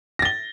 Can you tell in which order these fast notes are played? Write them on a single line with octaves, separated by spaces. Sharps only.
A#6 A6 G7